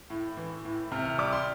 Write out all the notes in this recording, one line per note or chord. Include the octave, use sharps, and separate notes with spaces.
A2
E3
A2
C3 F6
F6
G3 D6
C6